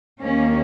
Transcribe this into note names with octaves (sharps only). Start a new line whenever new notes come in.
D#2 D#3 A#3 C#4